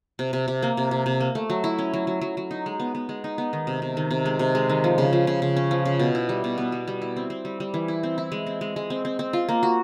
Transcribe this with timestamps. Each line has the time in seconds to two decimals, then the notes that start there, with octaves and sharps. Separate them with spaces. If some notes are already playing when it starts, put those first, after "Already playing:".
0.19 C3
0.33 C3
0.48 C3
0.63 A#3
0.77 C3
0.91 C3
1.06 C3
1.20 A#3
1.35 A3
1.50 F#3
1.64 E4
1.79 C#4
1.94 F#3
2.07 F#3
2.21 F#3
2.37 F#3
2.51 D#4
2.66 G#3
2.80 B3
2.95 B3
3.09 G#3
3.24 D#4
3.38 B3
3.53 D#3
3.67 C3
3.82 C3
3.97 D#3
4.11 C3
4.25 G#3
4.39 C3
4.55 G#3
4.69 D#3
4.84 F3
4.98 C#3
5.13 F3
5.27 C#3
5.42 C#3
5.57 C#4
5.71 F3
5.85 C#3
5.99 B2
6.15 E4
6.29 G3
6.44 B2
6.58 B3
6.72 G3
6.88 G3
7.02 E4
7.16 C4
7.30 C4
7.45 G3
7.60 G3
7.74 E3
7.88 E4
8.03 C4
8.18 E4
8.32 G#3
8.47 C4
8.61 G#3
8.76 G#3
8.90 C4
9.05 C4
9.19 C4
9.33 F4
9.49 A#3
9.63 F#4